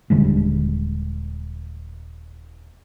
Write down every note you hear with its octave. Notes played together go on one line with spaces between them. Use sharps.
D#1 D3 G3 G#3